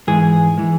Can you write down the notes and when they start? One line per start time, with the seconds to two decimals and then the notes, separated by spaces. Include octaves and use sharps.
0.07 G#2 E3 G#3 G#4
0.58 E3 G#3